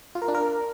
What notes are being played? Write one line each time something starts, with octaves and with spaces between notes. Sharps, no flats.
F4
A#4
D4
A#4